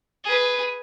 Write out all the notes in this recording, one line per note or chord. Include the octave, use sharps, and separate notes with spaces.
G#4 B4